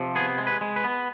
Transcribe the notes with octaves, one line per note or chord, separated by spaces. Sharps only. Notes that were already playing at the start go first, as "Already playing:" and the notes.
Already playing: C3 F3
B3 G#4
G#3
B4
G#3
B4
B3